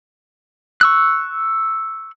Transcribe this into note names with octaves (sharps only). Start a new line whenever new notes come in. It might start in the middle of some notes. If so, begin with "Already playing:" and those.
C#6 E6 F#6